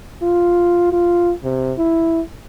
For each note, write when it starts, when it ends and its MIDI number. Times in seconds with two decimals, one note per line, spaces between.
0.22 0.89 65
0.92 1.32 65
1.43 1.73 48
1.78 2.21 64